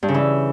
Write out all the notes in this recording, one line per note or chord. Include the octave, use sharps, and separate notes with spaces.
G2
C#3
E3